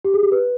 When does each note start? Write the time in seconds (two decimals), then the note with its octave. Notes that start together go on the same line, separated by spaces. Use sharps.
0.05 G4
0.14 G#4
0.23 G4
0.32 B4